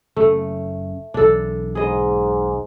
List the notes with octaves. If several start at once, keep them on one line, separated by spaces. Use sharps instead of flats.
F#1 C#3 A3 C#4
B1 E2 D4 A4
G#2 G#4 D#5